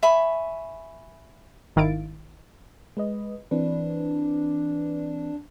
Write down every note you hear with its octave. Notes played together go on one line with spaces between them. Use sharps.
E5 G#5 B5 C#6
G#1 D#3 E4 F5 A6 D7
G#3 B4 D#5
E3 C4 D4 B4